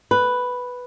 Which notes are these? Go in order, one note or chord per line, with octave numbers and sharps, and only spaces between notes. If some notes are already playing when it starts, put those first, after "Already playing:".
B4